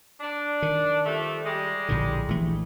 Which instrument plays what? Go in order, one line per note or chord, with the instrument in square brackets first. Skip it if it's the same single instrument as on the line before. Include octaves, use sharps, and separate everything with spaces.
[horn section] D4
[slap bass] D#3
[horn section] F3 G3 A3
G3 G#3
[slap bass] A#1 A2 D3
A#1 E3 A3